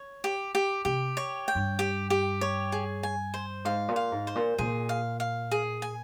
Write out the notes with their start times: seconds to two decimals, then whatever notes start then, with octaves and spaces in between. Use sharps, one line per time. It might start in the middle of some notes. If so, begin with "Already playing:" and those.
Already playing: C#5
0.24 G4
0.55 G4
0.85 C3 G4
1.17 C#5
1.48 G5
1.55 G2
1.79 G4
2.10 G4
2.41 C#5
2.72 G#4
3.03 G#5
3.34 C5
3.65 G#2 F5
3.88 A#2
3.96 F5
4.12 G#2
4.27 C5
4.35 A#2
4.58 A#2 G#4
4.89 F5
5.20 F5
5.51 G#4
5.82 G#5